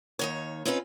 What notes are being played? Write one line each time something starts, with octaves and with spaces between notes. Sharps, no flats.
D#2 D#3 C#5
C4 C#4 D#4 F4 A#4 B4